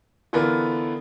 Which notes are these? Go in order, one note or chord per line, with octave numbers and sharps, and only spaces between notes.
D3 E3 B3 F4 A#4